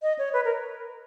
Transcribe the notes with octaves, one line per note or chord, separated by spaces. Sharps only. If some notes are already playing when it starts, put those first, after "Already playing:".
D#5
C#5
B4
A#4